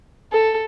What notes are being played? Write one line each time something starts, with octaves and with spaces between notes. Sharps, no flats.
A4